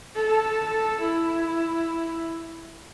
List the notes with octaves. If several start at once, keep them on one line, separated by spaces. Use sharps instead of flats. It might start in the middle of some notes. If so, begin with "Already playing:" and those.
A4
E4